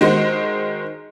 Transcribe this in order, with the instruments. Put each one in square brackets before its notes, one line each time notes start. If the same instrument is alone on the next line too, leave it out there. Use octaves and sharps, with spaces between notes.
[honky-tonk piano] D#3 G#3 F#4 C5